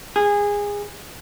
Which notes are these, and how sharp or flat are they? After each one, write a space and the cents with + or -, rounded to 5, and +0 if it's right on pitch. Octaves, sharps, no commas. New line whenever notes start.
G#4 -20